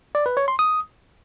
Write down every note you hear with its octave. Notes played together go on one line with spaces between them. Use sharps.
D5
B4
C#5
C6
D#6